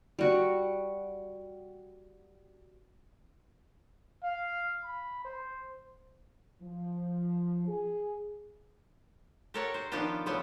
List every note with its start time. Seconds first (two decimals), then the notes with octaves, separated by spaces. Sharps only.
0.19 G3 F#4
4.23 F5
4.84 B5
5.25 C5
6.62 F3
7.68 G#4
9.54 G4 A4 A#4 C#5 D5 F#5
9.74 C5
9.92 D#3 F3 B3 D4 F4 G4
10.26 C#3 F3 G3 A3 B3